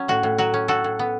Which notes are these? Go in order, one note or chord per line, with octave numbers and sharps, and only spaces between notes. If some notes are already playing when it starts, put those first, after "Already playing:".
Already playing: F#3 C#4
A2 F#4
A2
F#3 F#4
C#4
A2 F#4 A4
A2
B3